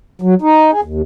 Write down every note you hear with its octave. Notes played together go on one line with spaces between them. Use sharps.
F#3
D#4
G#4
D#2